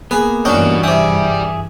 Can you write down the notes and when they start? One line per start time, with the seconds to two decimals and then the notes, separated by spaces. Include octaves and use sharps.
0.11 A#3 B3 G#4 B4
0.45 G2 E3 C#4 D4 F#4 D#5 G5
0.84 C3 G4 G#4 D5 E5 D#6